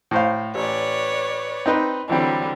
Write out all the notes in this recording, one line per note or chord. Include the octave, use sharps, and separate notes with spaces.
A2 C5 F5
A1 B4 C#5 D5
C4 D#4 B4
D3 E3 F#3 G3 C4